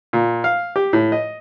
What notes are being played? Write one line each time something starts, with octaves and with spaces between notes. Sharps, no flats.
A#2
F5
G4
A2
D#5